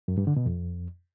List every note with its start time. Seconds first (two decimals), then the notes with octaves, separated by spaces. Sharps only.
0.08 F#2
0.18 G2
0.27 D3
0.36 B2
0.46 F2